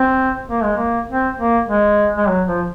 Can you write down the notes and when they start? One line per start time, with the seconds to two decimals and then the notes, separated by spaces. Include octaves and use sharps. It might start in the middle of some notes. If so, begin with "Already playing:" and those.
Already playing: C4
0.50 A#3
0.63 G#3
0.77 A#3
1.09 C4
1.39 A#3
1.68 G#3
2.17 G#3
2.28 F#3
2.47 F3